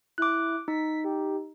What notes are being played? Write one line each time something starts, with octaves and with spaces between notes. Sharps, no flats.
E4 D6 F#6
D#4 B6
G4